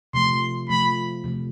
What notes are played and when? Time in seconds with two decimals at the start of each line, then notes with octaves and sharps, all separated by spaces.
0.14 C3 F3 A3 C6
0.69 C3 F3 A3 B5
1.24 C3 F3 A3